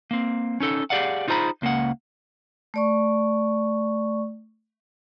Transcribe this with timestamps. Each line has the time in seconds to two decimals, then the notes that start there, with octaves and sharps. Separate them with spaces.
0.11 A#3 C4
0.60 C#4 D#4 A4
0.90 G4 G#4 D5 F5 F#5
1.28 D#4 F4 G#4 C5 A#5 B5
1.62 C#2 A#3 C#4 F#5
2.74 A3 D5 C#6